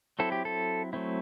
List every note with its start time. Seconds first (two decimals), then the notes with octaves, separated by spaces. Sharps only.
0.19 F#3 C4 E4 A4
0.32 G4
0.45 A4
0.93 F#3 A3 C4 E4